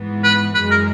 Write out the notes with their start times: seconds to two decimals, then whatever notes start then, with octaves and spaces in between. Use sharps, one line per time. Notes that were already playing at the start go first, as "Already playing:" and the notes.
Already playing: G#2 E3 B3
0.24 B4
0.55 F#2 E3 G#3 B4
0.71 A#4